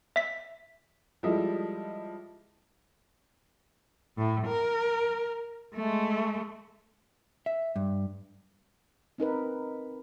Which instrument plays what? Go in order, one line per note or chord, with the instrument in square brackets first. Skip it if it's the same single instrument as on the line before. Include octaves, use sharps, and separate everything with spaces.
[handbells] E5 B6
[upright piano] F3 G3 G#3 E4 A4 D#5
[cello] A2
A#4
G#3 A3
[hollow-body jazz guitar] E5
G2
[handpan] C4 D#4 A#4 B4